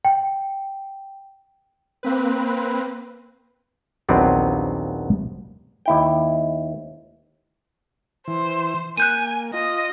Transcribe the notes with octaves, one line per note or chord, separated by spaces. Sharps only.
G5
A#3 C4 B4
A#1 D#2 F#3 B3 C4 D5
D#2 E4 G5
E3 C5
A#3 G#5 F#6 G6 D#7
F4 D#5